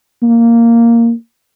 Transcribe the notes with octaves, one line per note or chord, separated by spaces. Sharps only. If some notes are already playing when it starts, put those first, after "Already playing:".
A#3